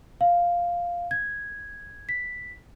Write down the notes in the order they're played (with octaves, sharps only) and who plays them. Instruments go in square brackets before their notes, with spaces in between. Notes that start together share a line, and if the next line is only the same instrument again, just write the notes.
[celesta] F5
G#6
B6